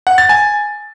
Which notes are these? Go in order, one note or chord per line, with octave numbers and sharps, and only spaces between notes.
F#5
A6
G#5